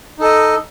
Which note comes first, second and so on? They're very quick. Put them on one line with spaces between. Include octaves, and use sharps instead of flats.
D#4 A4 D#5